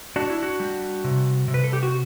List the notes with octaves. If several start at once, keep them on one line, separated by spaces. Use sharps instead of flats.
D4 F#4
E4
F#4
G3
C3
C3
B4
A4
G4
F#4